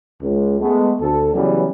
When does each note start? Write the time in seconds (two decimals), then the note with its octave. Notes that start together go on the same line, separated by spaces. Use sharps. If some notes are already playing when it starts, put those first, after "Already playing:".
0.21 C#2
0.60 G#3 A3 B3
1.00 D2 A4
1.34 C#3 E3 F#3 G3 B3 C#4